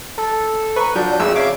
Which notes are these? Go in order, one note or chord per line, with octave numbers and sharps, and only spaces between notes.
A4
B4 A#5 C#6
F3 F#3 D4 D5 G6
G#1 F2 G#4 E6
C#3 C#5 D5 E5 F5 D6